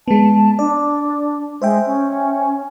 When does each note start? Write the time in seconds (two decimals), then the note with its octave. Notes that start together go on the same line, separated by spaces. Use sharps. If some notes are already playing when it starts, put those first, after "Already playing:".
0.08 G#3 B3 A5
0.59 D4 D5
1.62 G#3 C5 E5 G5
1.86 C#4